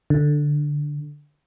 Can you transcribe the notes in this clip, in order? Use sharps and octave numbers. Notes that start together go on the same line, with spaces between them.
D3